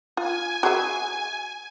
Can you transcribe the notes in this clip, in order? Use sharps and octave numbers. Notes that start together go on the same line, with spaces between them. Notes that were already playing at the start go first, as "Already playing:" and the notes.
F4 G#5
F#4 G#4 E5